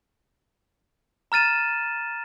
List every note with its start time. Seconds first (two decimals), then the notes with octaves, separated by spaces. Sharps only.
1.32 A#5 F6 A6 D#7 E7